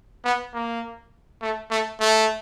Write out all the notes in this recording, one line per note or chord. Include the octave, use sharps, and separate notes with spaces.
B3
A#3
A3
A3
A3